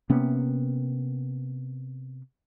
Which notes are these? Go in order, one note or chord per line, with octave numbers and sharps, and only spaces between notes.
C3 A#3 B3 C#4